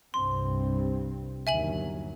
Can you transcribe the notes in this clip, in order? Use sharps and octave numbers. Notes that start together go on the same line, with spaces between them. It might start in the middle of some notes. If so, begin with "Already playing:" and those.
C2 G2 C4 C6
G1 D#2 F#3 E5 G#5 F#7